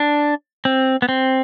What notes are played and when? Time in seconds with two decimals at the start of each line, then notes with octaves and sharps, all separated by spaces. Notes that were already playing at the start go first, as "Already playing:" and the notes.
Already playing: D4
0.65 C4
1.02 B3
1.09 C4